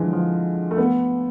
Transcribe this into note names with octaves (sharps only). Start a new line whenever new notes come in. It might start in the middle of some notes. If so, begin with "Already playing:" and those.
Already playing: D3 E3 F3 G#3
F3
A3
B3